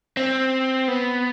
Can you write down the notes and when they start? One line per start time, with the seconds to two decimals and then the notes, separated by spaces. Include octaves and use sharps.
0.17 C4
0.88 B3